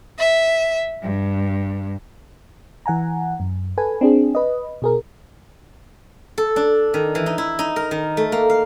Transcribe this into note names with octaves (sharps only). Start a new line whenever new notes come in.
E5
G2
E3 F#5 G#5 A#5
F#2
A4 B4 G#5
C4 D4 G#4
B4 D#5
B2 G#4 A#4
A4
D4
D#3
E3
D#4
E4
D#4
A#4
D#3
A3
A#3
F5